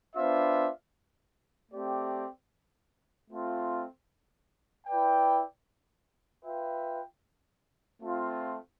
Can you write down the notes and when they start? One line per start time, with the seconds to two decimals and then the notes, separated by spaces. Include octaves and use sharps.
0.15 B3 D4 F4 C5 E5
1.72 A3 C4 G4 D5 G5
3.30 A3 C4 F4
4.87 E4 B4 D5 G5
6.45 F4 B4 E5 G5
8.02 A3 C4 F4